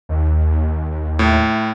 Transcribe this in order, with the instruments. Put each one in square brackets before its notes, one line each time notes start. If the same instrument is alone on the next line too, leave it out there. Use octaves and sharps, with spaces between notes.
[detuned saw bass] D#2
[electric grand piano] A2